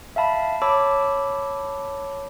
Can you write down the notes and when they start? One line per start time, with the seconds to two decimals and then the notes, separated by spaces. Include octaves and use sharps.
0.16 E5 F5 A5 B5
0.62 C#5 A5 B5 D6 E6